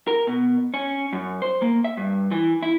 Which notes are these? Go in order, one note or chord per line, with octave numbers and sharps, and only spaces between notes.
A#4
B2
C#4
F#2
C5
A#3
E5
G2
E3
E4